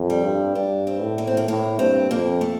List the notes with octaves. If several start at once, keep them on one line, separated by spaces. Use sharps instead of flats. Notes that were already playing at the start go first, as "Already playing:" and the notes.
Already playing: F2
G3
G2
G2 D4
C4
A2
A#3
C4
A#3
A2 A#3
G2 C4
F2 A#3
A3